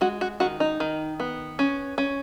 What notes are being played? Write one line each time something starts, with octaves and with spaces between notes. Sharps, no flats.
G#3 F#4
F#4
D#3 F#4
D#4
D#3
B3
C#4
C#4